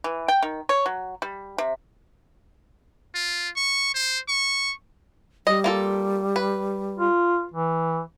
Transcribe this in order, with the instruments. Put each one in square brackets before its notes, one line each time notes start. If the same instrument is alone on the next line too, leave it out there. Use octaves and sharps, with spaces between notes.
[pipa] E3
G5
D#3
C#5
F#3
G3
C3
[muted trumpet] F4
C#6
C5
C#6
[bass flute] G3 [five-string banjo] D#5
[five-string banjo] A#3 F4 A4
B4
[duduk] F4
E3